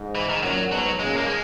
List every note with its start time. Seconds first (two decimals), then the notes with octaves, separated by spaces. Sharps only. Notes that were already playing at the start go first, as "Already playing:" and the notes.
Already playing: G#2
0.15 E3
0.29 D#3
0.43 F#2 A#2 F#3
0.71 G#2 B2 F#3
0.99 A#2 C#3 G#3
1.17 A#3
1.27 G#3